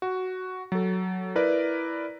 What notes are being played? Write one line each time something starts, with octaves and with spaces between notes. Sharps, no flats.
F#4
F#3 A4
E4 A#4 B4 D5